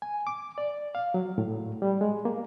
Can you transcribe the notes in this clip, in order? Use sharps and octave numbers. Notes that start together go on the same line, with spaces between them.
G#5
D6
D5
F5
F#3
A2
G3
G#3
A#3